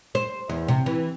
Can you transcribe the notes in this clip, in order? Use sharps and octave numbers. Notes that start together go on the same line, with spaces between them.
C5
E2
C3
E3